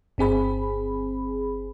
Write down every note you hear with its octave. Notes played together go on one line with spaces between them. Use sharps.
G1 C4 G#4 B5